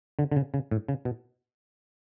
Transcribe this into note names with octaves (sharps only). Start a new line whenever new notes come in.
D3
D3
C#3
C#3
A2
C#3
B2